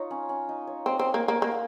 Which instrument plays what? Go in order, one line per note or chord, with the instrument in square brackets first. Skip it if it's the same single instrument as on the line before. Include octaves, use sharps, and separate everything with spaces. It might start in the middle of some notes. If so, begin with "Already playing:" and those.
Already playing: [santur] D#4 F4 C#5
C#4
C#4
D#4
C#5
[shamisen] C4 [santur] D#5
[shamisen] C4
A#3
A#3
[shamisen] A#3 [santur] F5
[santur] F#5